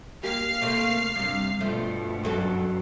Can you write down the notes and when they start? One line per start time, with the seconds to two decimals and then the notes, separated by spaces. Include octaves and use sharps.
0.23 A#3 G4 F5 F6 C7
0.62 C3 A3 A#3
1.16 G2 C3
1.60 G2 B2 F3 A3
2.23 F#2 F#3 A4